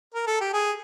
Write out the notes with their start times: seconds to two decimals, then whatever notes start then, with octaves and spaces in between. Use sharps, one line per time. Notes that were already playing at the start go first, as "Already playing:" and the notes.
0.15 A#4
0.27 A4
0.41 G4
0.53 G#4